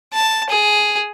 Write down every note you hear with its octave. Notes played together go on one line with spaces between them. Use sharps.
A5
G#4